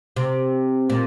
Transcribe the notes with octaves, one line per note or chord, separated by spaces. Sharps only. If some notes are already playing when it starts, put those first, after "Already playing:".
C3
A#2